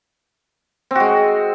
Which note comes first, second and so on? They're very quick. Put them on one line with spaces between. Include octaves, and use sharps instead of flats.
C4 F#4 G#3